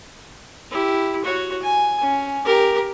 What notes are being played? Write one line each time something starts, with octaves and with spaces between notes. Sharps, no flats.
E4 G4
F#4 C#5
G#5
C#4
G4 A#4